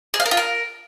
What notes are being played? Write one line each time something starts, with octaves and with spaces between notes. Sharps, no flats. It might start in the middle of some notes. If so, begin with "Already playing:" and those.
G#4
F5
A#4
F4
A#4